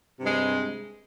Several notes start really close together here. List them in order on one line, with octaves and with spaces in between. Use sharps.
C3 G2 G#3